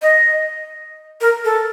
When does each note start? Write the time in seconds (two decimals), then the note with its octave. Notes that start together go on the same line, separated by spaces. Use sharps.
0.02 D#5
1.21 A#4
1.45 A4